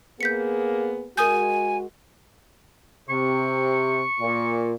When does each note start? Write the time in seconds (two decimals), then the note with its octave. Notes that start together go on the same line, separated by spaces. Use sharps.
0.21 A#3 B3 G#4 G6 B6 C#7
1.17 G#3 F#4 A#4 G#5 D#6 G6
3.10 C3 C#6
4.20 A#2